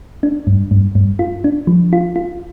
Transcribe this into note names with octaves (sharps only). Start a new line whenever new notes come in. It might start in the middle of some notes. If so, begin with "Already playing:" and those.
D4
G2
G2
G2
F4
D4
F3
F4
F4